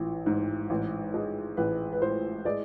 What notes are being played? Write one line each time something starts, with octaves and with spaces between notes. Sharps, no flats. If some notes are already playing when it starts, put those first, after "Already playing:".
Already playing: A1 E3
G#2
A1
G#3
A1 B4
B4
A2 C5
G#3 D5